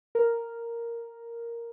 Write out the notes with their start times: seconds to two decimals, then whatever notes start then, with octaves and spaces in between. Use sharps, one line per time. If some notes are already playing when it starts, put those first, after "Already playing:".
0.15 A#4